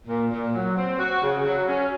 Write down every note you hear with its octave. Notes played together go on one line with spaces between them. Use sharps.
A#2
A#2
F#3
C4
F#4
C#3
F#3
C#4